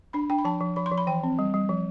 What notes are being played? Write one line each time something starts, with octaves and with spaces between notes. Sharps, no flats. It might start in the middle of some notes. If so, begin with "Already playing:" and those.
D4 B5
D4 G5
B5
F3 A5
F3
F3 B5
C6
F3
B5
E3 G5
C4
G3
G3
F3